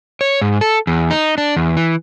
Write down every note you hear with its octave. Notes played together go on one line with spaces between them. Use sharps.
C#5
G#2
A4
E2
D#4
D4
E2
E3